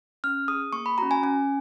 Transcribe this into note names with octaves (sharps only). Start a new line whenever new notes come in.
C#4 F6
G#4 D#6
A#3 C#6
B5
C#4 F#4 A#5
G#5
C#4 G#5